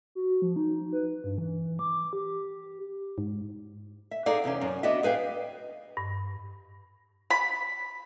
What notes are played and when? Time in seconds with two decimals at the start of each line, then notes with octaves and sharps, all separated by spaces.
0.15 F#4
0.42 F3
0.56 D#4
0.93 B4
1.24 G2
1.38 E3
1.79 D6
2.13 G4
3.18 G#2
4.11 E5
4.26 D#4 G#4 A4 D5 F5 F#5
4.44 E2 C3 C4 C#4
4.61 F#2
4.83 B3 D4 F#4 D#5 E5
5.03 G#4 B4 F5 G5
5.97 G2
7.30 B5